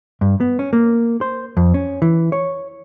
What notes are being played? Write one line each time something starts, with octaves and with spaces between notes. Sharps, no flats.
G2
B3
C#4
A#3
C5
F2
C#4
E3
C#5